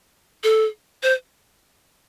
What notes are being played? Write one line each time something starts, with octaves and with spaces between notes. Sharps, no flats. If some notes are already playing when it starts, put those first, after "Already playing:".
A4
C5